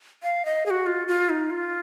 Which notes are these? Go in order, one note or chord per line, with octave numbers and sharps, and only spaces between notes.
F5
D#5
G#4
F#4
F4
F4
D#4
F4